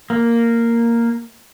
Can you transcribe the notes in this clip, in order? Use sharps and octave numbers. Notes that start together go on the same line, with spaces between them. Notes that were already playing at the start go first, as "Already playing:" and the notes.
A#3